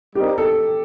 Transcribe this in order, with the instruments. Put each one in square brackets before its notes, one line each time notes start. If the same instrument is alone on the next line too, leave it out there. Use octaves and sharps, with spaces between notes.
[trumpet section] G3 C4 D#4 A#4 [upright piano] G4
[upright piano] A4